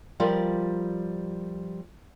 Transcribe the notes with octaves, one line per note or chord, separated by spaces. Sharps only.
F3 G3 F4 A#4 D5